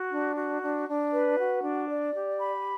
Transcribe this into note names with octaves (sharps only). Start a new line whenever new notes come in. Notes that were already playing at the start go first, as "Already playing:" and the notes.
Already playing: F#4
D4
F#4
D4
D4
B4
F#4
D4
D5
G4
B5